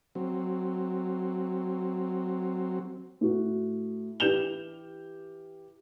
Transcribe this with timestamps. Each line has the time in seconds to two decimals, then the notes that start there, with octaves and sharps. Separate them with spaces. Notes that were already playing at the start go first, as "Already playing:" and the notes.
0.15 F#3 C4
3.21 A2 F#4
4.20 E3 G4 G6 E7 F7 G7